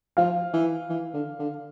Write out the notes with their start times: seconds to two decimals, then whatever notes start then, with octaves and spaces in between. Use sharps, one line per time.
0.17 F3 F5
0.54 E3
0.89 E3
1.14 D3
1.39 D3